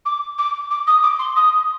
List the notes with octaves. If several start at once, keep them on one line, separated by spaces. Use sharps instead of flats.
D6
D6
D6
D#6
D6
C6
D#6